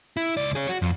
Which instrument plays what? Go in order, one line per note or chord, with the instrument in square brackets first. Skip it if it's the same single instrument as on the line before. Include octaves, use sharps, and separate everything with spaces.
[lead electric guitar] E4
C#2 D5
G#4 C#5
F#4
F2